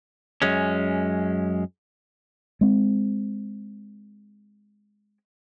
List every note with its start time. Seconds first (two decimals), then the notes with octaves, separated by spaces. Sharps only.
0.42 F#2 G#3 C#4
2.61 G#3 C4